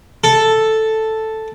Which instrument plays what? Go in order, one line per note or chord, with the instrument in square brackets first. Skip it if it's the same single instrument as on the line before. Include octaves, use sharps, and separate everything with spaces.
[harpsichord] A4